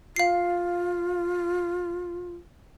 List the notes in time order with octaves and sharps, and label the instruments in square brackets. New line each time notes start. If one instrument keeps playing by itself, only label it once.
[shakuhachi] F4 [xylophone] F5 C7